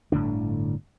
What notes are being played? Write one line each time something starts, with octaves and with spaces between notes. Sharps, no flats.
G1 A2 D3 D4